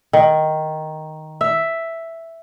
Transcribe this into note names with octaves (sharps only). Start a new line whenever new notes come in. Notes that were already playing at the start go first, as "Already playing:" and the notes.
D#3
E5